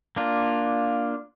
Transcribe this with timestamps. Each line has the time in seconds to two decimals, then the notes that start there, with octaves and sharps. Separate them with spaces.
0.16 A#3 D4 F4